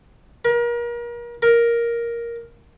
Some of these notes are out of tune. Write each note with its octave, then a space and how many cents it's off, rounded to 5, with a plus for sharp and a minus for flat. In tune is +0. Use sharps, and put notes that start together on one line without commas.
A#4 +35
A#4 +5